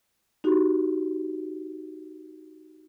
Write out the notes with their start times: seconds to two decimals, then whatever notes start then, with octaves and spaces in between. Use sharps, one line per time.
0.44 D#4 F#4 G4